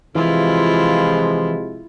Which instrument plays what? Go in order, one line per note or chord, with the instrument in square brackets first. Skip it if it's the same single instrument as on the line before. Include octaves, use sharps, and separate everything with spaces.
[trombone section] C3 F3 G#3 [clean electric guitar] E3 [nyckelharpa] E4 F4